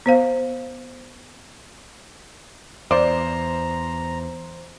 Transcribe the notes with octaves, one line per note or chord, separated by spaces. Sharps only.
B3 C5 F5
E2 C5 D5 A#5